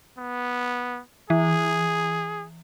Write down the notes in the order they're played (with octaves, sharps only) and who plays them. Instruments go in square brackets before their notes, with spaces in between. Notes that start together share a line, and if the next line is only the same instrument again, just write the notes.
[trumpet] B3
[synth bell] E3 [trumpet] G#4